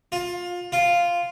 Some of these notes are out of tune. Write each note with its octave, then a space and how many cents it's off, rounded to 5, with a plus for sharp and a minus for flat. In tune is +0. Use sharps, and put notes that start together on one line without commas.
F4 +20
F4 -5